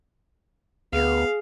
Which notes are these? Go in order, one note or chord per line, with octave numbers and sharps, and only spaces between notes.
D2 B3 G#4 F5